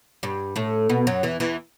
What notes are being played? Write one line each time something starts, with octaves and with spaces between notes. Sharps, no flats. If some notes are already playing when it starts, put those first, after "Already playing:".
G2 G3
A2 A3
B2 B3
F#2 F#3
E2 E3
E2 E3